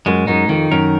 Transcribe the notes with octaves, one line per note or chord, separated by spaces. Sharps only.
F#2 G#3
F#2 D#4
F2 D#3
F#2 A#4